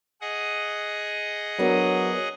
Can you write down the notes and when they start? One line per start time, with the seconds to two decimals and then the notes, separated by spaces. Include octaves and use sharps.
0.21 G#4 D#5 F#5
1.59 F#3 B3 D4 A#4